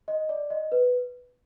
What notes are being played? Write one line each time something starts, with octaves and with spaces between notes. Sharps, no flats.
D#5
D5
D#5
B4